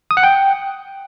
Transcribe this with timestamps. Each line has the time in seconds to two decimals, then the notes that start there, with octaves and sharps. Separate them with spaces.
0.11 D#6
0.17 F#5
0.23 G5